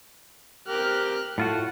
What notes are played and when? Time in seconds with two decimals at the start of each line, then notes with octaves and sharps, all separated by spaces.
0.68 C4 G4 A#4 F6 F#6
1.38 A2 A3 F4 F#4 F#5